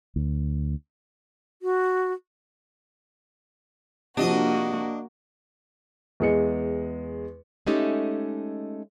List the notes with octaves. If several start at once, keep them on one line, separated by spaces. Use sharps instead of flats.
D2
F#4
C3 F3 A#3 D4 F#4 D#5
E2 G#3 C#7
G#3 A3 C#4 D#4 G4 A4